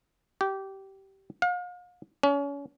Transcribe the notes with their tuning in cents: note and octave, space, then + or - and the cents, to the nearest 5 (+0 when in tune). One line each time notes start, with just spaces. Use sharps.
G4 -20
F5 +40
C#4 +35